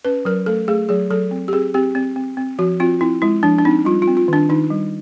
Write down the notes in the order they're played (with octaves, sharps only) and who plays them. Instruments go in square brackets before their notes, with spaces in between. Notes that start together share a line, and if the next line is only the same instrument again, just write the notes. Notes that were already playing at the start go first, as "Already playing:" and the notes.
[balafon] C#4 B4
F#3 A#4
A3 A4
A3 G#4
F#3 G#4
F#3 A4
C4
G4
C4 G#4
C4 G4
C4
C4
C4
F3 F#4
C4 F4
C4 E4
G#3 E4
F3 D4
D4
C4 D#4
G3 F4
F4
C4
F4
D#3 D4
D#3 D#4
G3